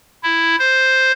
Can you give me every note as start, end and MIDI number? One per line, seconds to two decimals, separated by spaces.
0.23 0.56 64
0.59 1.12 72